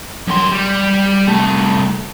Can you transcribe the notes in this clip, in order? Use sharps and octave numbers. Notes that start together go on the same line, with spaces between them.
F#2 C6
G3
C2 A3